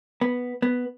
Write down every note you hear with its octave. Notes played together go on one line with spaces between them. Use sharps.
B3
B3